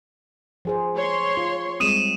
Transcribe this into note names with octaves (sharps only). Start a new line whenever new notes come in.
F3 G#4 C5
C#5 C6
F4
G3 G#3 C4 D#6 D#7 E7